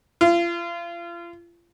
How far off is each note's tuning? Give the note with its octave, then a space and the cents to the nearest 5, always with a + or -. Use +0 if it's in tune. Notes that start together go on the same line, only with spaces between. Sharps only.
F4 -35